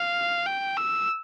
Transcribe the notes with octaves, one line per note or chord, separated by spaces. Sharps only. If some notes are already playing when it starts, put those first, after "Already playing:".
Already playing: F5
G5
E6